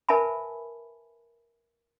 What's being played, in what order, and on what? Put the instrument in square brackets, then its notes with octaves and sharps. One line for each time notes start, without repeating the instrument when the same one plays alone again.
[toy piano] A#4 B4 E5 G#5 A5 B5